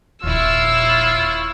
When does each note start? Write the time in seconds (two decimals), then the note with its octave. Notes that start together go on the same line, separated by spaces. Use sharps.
0.24 D#1 A#1 E4 F4 C#5 E6